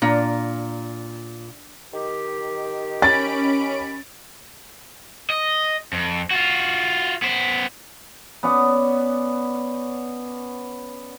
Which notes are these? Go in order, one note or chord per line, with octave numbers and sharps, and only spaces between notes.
A#2 D4 F5 A#5
D#3 G4
C#4 B5 A6 D7
D#5
F2
F4 F#4
B3 C5
B3 C#4 D5 F#5